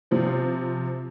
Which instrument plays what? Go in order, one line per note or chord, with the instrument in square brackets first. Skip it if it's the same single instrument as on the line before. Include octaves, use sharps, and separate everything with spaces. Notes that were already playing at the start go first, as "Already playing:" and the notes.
[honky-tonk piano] C3 F3 C4